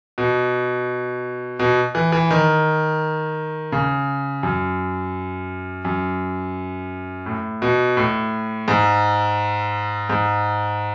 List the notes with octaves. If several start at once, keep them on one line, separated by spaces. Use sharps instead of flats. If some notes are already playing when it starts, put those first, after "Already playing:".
B2
B2
E3
E3
D#3
C#3
F#2
F#2
A2
B2
A2
G#2
G#2